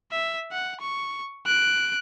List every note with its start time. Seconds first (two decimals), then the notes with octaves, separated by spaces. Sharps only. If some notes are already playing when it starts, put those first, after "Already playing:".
0.12 E5
0.52 F#5
0.81 C#6
1.46 F#6 D7